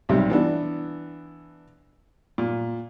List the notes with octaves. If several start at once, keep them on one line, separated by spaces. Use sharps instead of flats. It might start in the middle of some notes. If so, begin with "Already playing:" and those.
B1 C3 G3
E3 B3 D4
A#2